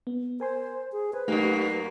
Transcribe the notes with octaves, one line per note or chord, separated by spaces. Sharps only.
B3
A#4 C5 G#5 C6
G#4
B4 C5 G#5
F#2 A3 A#3 D#4 G4